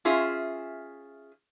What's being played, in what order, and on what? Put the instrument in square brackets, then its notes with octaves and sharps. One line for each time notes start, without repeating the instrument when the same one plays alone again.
[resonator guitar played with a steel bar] C#4 F4 G#4 E5